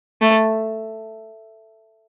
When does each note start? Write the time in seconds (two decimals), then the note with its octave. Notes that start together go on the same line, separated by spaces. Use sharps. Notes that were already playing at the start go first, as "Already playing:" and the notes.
0.21 A3